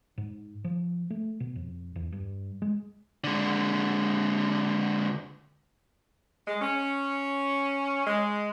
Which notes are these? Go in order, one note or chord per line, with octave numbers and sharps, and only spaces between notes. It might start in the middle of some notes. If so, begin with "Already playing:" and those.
G#2
F3
A3
B2
F2
E2
G2
G#3
D3 G#3
G#3
C#4
G#3